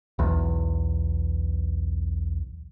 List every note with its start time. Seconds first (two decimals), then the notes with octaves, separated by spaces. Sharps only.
0.19 B1 E2